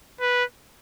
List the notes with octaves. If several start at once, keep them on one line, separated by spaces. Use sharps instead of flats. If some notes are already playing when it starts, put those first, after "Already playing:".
B4